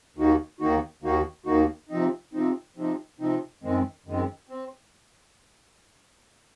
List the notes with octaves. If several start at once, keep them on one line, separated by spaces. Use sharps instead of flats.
D#2 D#3 A#3 D#4 F#4
D#2 D#3 A#3 D#4 F#4
D#2 D#3 A#3 D#4 F#4
D#2 D#3 A#3 D#4 F#4
C3 F3 C4 D#4
C3 F3 C4 D#4
C3 F3 C4 D#4
C3 F3 C4 D#4
F#2 D#3 G#3 C4
F#2 D#3 G#3 C4
C4